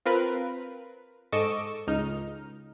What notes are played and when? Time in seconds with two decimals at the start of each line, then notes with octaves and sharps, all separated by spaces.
0.05 C4 F4 A#4 B4
1.32 G#2 A4 D#5 C#6 D6 E7
1.87 C#2 D#4 F6